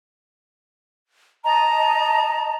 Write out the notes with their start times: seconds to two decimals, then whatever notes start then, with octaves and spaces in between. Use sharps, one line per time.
1.44 D#5 A5 A#5